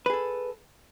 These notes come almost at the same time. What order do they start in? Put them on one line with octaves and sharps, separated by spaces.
B4 G#4 A4